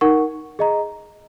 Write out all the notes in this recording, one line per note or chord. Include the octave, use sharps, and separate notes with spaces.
D#4 A#4 F#5 C#6
G#4 D#5 A#5